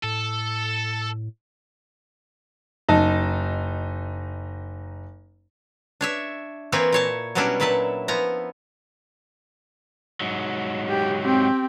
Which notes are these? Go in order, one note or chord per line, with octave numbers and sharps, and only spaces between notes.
A2 A4
F#1 D#4 A5
D4 C#5 E5
E3 A#3 C4 E4 B4 C#5
A#2 C#5 A5
B2 F#3 G3 C#4 D4 E4
A#2 F#3 B4 E5 A5
F3 B3 E4 A#5
G#2 F#3
G4
C4 G4